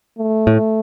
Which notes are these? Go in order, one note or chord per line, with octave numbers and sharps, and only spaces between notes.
A3
A2